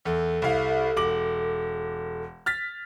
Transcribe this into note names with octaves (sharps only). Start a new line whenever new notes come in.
E2 A4
C2 E4 F5
E1 D6 F#7
F6 A6 B6